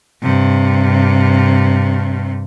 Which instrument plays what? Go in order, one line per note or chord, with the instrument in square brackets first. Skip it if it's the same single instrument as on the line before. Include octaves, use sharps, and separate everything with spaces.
[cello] G2 C3